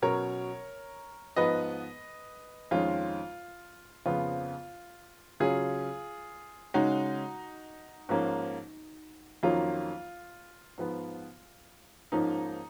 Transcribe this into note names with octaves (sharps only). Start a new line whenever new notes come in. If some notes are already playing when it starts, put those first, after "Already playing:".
B2 F#3 C#4 A#4 C#5
G#2 F3 B3 B4 D#5
F2 D#3 G#3 C#4 F4
F2 C#3 F3 B3 F4
C#3 F#3 C#4 F4 G#4
C#3 G#3 C#4 D#4 F#4
G#2 F3 A#3 C#4
F2 D#3 F#3 A#3 C#4 F4
G#2 F3 B3
G#2 F3 A#3 C#4 D#4